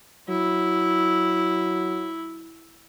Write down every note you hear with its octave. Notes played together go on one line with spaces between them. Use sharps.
F#3 E4